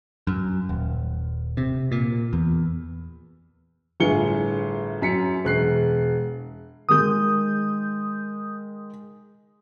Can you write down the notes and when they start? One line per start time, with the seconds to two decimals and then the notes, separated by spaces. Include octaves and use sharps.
0.27 F#2
0.69 D#1
1.57 C3
1.92 A#2
2.33 E2
4.00 G1 A2 F4 G#4 C#7 G7
5.02 F#2 B6 C#7
5.45 E1 F#6 C7
6.89 D#3 G#3 D#6 G6